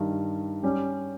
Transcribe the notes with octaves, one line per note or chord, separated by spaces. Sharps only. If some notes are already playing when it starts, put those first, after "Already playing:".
Already playing: G2 D#3 G3
G3 C#4 G4